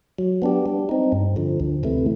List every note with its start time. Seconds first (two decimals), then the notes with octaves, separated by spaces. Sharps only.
0.19 F#3
0.42 B3 D4 G4
0.66 G3
0.89 C4 D#4
1.12 G2
1.36 D3 F3
1.60 D2
1.83 C3 E3 A3